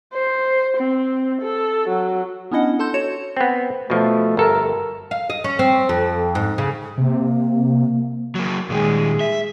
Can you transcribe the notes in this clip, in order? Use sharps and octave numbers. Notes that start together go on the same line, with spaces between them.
C5
C4
A4
F#3
B3 C#4 D4 E4 D#5 F#5
A4 A5 C6 G6
F#4 C#5 C#7 E7
B3 C4
B2 F3 A3
G1 A4 A#4
F5
D#5
C#4
C4
F2
G#2
C#3
C3 A#3
F#3 A#3
A#2 D#3 G#3 G#4
E5